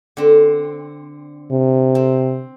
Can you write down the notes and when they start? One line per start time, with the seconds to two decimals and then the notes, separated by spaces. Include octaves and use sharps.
0.17 D3 C4
1.51 C3
1.95 C4